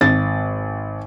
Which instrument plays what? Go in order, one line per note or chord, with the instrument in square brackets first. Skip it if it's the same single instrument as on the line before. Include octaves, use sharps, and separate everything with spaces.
[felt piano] G#1 A6